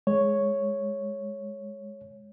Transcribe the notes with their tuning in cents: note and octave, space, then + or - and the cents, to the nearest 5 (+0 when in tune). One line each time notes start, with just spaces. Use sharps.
G#3 +0 C#5 +0